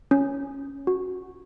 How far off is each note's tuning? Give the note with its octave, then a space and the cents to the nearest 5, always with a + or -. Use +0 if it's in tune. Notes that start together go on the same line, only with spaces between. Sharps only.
C#4 +0
F#4 -5